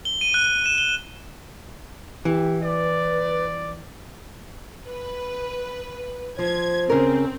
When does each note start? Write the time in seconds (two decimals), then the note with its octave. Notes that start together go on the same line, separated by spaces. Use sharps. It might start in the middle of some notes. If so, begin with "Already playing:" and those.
0.05 G7
0.21 D#7
0.34 F#6
0.46 D#7
0.66 E7
0.78 G7
2.25 E3 G4
2.63 B4 D5
4.85 B4
6.39 F3 C5 G#6
6.90 C#3 C4 C#4 A#4